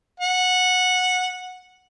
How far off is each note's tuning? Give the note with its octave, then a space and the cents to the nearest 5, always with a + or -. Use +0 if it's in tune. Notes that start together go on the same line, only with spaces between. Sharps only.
F#5 -15